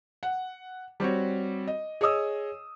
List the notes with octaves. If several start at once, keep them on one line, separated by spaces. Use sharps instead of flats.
F#5
G3 C4 F#4 C#5
D#5
G#4 C#5 D#5 D#6 E6